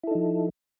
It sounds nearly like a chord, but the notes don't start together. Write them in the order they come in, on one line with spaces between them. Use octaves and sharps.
E4 A4 D#4 F3